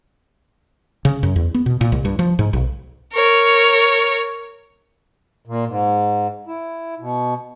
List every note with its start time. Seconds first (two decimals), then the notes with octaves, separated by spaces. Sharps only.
1.05 C#3
1.23 F#2
1.36 E2
1.54 B3
1.66 B2
1.81 A#2
1.92 C2
2.05 G2
2.19 F3
2.39 G#2
2.53 B1
3.13 A#4 C#5
5.46 A#2
5.67 G#2
6.47 E4
6.99 B2